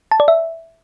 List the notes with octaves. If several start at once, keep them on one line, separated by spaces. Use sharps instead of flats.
A5
D5
E5